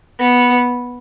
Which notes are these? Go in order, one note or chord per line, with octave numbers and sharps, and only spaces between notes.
B3